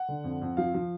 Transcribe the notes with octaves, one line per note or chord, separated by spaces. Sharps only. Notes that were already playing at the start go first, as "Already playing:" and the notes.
Already playing: F#5
D3
F2
F2
F3 F5
F3